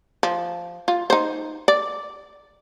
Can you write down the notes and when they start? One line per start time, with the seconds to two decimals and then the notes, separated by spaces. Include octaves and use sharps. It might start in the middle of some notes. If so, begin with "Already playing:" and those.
0.23 F3
0.88 F4
1.10 D#4 C5
1.68 D5